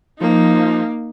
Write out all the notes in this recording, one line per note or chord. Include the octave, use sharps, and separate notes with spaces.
F3 A#3 D#4